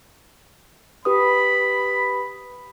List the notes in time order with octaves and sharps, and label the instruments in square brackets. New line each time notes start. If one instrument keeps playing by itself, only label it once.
[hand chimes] G4 B4 D#6 [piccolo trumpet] B5